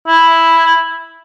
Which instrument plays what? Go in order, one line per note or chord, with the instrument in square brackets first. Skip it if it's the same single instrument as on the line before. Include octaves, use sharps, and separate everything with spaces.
[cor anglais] E4